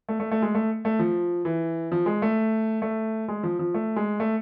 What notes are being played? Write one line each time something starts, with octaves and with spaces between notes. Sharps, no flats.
A3
A3
A3
G#3
A3
A3
F3
E3
F3
G#3
A3
A3
G#3
F3
F3
A3
G#3
A3